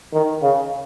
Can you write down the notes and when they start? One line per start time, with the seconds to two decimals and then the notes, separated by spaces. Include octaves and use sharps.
0.13 D#3
0.42 C#3